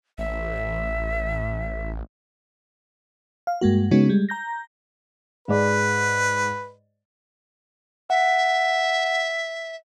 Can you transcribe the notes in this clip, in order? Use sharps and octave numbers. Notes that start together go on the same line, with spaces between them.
A1 E5
F5
G2 G#3 A#3 F#4
C#3 G#3 B3 C#4 D#4 F#4
G3 G#3
A#5 G6 A#6
G#2 G#4 B4 D5
E5 F#5